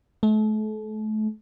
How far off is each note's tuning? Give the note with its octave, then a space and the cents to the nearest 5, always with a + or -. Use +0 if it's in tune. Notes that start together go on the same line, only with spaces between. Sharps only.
A3 -35